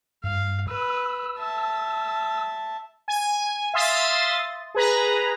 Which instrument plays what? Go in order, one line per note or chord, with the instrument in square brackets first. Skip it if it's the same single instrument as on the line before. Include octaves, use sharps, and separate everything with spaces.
[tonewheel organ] G2 [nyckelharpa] F5
[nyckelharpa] B4 [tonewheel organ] E6
[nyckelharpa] E5 A5
[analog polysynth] G#5
E5 F5 C6 D#6 A6
G#4 B4 A#5